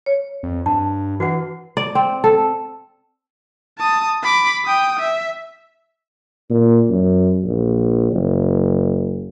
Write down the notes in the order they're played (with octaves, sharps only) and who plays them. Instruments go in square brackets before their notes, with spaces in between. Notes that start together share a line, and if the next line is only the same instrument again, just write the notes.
[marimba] C#5
[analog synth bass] F2
[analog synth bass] G2 [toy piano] A5
[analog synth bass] E3 [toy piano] F#4 B4 F#5
[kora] D5
C4
A4
[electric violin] A5 D#6
B5 D6
G5 D#6
E5
[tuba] A#2
F#2
A#1
F#1